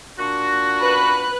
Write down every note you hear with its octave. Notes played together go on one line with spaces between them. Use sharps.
A#2 D4 F#4
B4 F#6